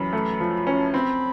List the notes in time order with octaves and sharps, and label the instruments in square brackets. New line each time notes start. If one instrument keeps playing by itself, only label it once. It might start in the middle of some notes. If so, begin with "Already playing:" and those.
Already playing: [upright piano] F#2 E3 [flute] B5
[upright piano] A3
F3
C#4
[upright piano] C4 [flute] B5